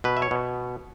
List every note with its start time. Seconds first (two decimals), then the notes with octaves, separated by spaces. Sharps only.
0.04 B2 B4
0.17 E5
0.22 C#5
0.31 B2